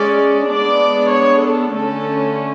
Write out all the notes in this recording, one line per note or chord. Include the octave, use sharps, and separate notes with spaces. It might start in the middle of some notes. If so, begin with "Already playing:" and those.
Already playing: G#3 C#4 D5
G#3 B3 D4 D5
C#5
A4
D3 A3 C#4 A4